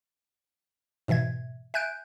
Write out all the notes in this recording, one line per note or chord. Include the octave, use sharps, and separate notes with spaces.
G#2 B2 E3 E5 G#6
E5 G#5 F#6 G6 D7